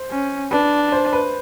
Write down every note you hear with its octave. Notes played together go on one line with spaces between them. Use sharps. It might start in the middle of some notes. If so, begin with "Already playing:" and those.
Already playing: C5
C#4
D4 B4
C5
B4